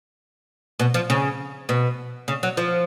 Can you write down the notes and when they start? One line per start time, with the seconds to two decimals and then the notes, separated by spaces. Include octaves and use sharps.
0.80 B2
0.94 F3
1.10 C#3
1.69 B2
2.28 C#3
2.43 F#3
2.57 F3